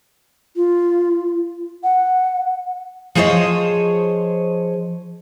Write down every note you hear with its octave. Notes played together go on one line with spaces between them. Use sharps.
F4
F#5
F3 G#4 C5 C#5 D#5